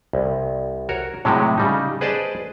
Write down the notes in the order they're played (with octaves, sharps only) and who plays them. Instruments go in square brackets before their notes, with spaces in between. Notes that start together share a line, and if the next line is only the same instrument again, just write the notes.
[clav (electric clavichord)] C2
F#4 A#4 C#5
A2 C3 F#3 G#3 F#4 G4
C#3 G3 D#4
G#4 B4 C5 D5 D#5 A5